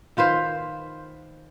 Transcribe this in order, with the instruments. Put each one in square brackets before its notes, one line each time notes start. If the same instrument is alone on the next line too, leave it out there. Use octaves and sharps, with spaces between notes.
[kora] D#3 F4 B4 C5